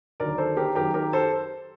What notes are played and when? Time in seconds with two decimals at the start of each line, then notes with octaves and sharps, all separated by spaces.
0.20 D#2 D3 F#3 A#4 D5
0.38 A4 C5
0.57 G4 A#4
0.75 F#2 D#3 F#3 G4 A#4
0.94 G4 A#4
1.13 A4 C5